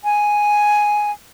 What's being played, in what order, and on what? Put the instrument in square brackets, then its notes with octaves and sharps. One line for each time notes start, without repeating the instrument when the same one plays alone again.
[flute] G#5